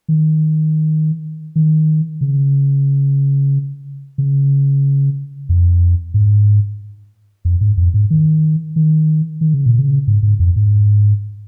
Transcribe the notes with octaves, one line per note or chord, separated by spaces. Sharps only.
D#3
D#3
C#3
C#3
F2
G#2
F2
G#2
F2
G#2
D#3
D#3
D#3
C#3
A#2
C#3
G#2
G#2
F2
G#2